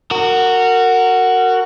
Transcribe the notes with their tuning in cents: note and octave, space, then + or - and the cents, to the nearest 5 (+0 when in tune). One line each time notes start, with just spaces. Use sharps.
F#4 +0 A#4 -25